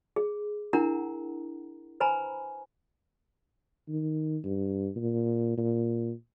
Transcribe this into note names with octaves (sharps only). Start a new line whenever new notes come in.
G#4
D4 E4 A#4 F#5 A#5
B4 C5 G#5 A#5 B5
D#3
G2
A#2
A#2